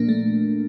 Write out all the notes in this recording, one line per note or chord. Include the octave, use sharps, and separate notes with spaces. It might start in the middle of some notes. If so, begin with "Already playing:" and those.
Already playing: A#2 F3 A#3 D4
A3